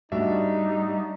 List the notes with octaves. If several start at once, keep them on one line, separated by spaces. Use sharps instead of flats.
G#2 G3 A3 D4 D#4 F#4 D5 E5